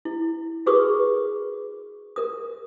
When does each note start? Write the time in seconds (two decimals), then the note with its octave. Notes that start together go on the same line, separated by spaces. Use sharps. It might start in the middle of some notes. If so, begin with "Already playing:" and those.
0.05 E4
0.66 F#4 G#4 A#4 B4 C#6 D#6
2.16 A#4 D#6